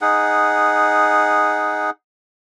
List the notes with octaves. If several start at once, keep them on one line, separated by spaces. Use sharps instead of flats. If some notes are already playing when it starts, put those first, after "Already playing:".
D#4 G#4 F#5